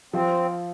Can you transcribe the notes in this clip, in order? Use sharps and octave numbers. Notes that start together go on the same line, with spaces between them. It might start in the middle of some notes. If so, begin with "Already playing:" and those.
F3 C4 F4